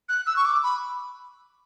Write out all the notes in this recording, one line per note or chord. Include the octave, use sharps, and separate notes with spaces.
F#6
E6
C#6
D6
B5